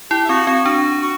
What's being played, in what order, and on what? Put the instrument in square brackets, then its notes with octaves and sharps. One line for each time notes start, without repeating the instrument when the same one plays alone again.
[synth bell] E4 [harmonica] G4
[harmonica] E4
[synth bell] C4 [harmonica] F#4
[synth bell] C4 [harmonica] F#4
[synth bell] D4 [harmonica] F#4
[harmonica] F#4